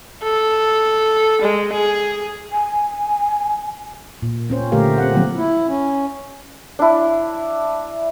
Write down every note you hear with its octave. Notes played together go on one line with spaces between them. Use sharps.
A4
G#3
G#4
G#5
A#2
C4 C#4 C5
A#2 D3 A3 G4 A#4 F5
C4 F#5
D3 F3 F#3 A#3 C4
E4
C#4
D4 E4